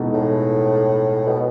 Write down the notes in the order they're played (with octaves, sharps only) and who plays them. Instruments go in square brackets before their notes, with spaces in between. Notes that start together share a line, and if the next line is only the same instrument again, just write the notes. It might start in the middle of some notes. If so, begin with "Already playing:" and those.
Already playing: [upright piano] E2 B2 G#3 D#4 A4
[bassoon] A2
B2